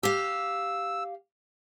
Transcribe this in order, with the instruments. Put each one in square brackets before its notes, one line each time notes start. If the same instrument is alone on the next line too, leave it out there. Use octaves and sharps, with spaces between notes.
[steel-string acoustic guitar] G4 F5 [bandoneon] E6